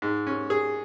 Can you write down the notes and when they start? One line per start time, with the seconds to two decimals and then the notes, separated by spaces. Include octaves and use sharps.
0.02 G#2
0.27 C#4
0.50 G#4